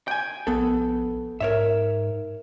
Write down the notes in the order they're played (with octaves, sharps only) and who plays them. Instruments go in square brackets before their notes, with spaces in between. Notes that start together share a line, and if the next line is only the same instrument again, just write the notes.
[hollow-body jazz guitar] G5 G#5
[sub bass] A#1 [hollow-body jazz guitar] B3 A4
[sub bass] G#2 [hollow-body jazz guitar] A#4 C#5 E5